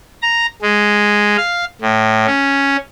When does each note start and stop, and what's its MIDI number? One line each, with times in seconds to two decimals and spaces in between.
0.22 0.46 82
0.62 1.36 56
1.37 1.65 77
1.81 2.26 45
2.26 2.77 61